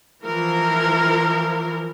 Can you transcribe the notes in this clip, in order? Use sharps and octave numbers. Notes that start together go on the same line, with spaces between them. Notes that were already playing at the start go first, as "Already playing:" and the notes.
E3 F3 A#4